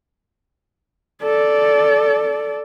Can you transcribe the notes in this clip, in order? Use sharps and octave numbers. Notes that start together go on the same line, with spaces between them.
A4 D5